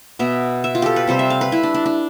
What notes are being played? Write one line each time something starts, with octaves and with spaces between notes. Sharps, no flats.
B2 B3 E5
E5
F4
G4 A4
B4
C3 G3 C4 C5
E5
F5
B4
E4
D4
D4
D4